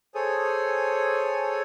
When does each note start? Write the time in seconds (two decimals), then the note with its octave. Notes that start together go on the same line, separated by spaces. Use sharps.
0.15 G#4 A4 C5 C#5 G#5 D#6